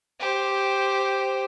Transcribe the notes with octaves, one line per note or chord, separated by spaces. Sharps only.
G4 C5